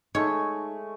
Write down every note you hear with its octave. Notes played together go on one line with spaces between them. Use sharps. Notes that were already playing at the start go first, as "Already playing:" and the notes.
G#3 A3 D#4 C#5 C#6